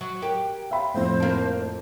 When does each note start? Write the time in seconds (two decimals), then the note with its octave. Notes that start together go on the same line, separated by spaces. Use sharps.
0.01 F#3
0.22 G4 A#4
0.71 E5 F5 G5 B5
0.94 F2 A2 C5
1.20 A#3 D4